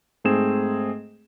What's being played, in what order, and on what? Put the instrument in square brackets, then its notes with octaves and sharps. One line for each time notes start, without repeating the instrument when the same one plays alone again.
[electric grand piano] G#2 A3 C4 G#4 E7